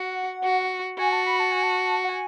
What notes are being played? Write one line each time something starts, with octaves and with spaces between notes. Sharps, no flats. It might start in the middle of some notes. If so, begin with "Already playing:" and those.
Already playing: F#4 F#5
F#4
F#4 G#5
A5
B5
A5
G#5
A5
F#5
G#5